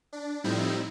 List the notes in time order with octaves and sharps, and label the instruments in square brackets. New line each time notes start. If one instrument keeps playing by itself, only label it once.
[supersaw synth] D4
A2 F3 G3 C4 D#4 E4